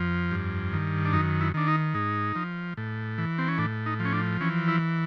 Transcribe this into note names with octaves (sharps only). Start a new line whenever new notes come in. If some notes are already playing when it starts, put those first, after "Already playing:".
Already playing: F2 F3
G2
D#3
D4
F#2 D#4
E4
D#3 D4
D#4
G#2 D#4
F3
A2
E3
C4
C#4
A2 D4
D#4
F3
C#4
D4
E3 C#4
E4